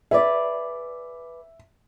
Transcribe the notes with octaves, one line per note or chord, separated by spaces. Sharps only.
G#4 B4 D5 E5